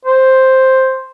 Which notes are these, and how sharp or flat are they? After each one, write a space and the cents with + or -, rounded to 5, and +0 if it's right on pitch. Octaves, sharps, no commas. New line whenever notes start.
C5 +5